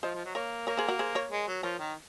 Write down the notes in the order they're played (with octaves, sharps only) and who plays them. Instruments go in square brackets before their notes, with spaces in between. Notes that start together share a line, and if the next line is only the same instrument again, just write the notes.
[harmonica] F3 [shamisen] C5 D#5
[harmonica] F3
F#3
[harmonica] A#3 [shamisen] A#4 C#5
[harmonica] A#3 [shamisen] A#4 C#5
[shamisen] G#4 C5
F#4 A#4
G#4 C5
A#4 C#5
[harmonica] G#3
F#3
[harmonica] F3 [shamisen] A#4 C#5
[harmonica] D#3